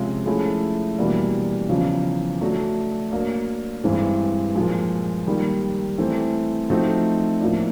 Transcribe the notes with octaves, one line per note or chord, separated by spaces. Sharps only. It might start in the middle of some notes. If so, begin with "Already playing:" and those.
Already playing: C3 F3 G#3 C#4 F4
F3 A3 C#4 E4 G#4
E2 B2 G3 A#3 D4
E2 C#3 F3
F#3 A3 D4 F#4
F#3 A#3 D4
G2 E3 G#3 C4
A#2 F3 G#3
D#3 G3 A#3
E3 A3 C4
F3 A3 C4 D#4 F#4
A2 F3 A#3 D4